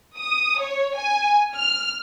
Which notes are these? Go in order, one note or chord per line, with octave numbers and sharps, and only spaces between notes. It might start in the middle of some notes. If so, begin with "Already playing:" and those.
D#6
C#5
G#5
F6